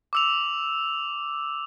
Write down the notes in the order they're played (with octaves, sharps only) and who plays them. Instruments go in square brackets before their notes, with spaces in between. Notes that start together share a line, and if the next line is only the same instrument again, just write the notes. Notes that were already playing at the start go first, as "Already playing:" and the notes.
[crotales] D6 E6 F7